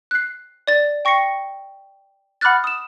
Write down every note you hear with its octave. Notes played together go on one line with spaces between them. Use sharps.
F#6 C7
D5 A6
G5 C#6 A#6 C7 C#7
F#5 B5 D6 F6 F#6 A6
D#6 E7